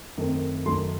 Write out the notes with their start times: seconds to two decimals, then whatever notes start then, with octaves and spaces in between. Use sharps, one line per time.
0.18 F#2 D#3 A3 C4
0.65 F#2 D#3 F#3 A3 C6